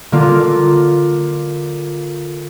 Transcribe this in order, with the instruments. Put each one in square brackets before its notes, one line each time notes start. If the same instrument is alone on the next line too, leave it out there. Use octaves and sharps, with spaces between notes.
[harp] D3 A#3 F4